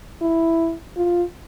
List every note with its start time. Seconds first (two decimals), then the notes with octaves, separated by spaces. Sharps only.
0.21 E4
0.97 F4